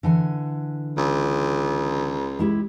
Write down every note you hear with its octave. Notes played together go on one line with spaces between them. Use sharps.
D3 E3 G#5
C#2
G#3 E4 G4